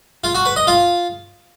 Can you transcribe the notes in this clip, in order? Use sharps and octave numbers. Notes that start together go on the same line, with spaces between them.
F4
F#4
B4
D#5
F4